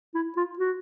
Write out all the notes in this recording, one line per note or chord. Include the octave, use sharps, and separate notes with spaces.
E4
F4
F#4